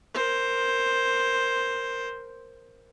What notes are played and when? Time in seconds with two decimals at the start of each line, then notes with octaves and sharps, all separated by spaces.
0.14 A#4 C5